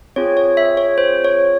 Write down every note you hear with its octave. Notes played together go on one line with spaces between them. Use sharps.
C4 F4 G#4 C#5
C#5
E5
C#5
C5
C#5